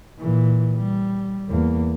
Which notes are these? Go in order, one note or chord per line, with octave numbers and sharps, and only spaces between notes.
A#2 E3
G3
E2 A#3